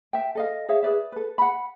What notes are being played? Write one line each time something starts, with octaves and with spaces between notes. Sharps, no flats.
E5 G5
A4 D#5 F5
G#4 C#5 E5 F5
G#4 B4 D5 E5
A4 B4
F#5 B5